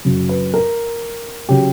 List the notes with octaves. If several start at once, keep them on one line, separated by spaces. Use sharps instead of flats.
F#2 C#3 F#3
B4
A#4
C#3 F#3 G4